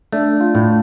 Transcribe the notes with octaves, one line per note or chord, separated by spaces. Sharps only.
A3 D4
F4
A2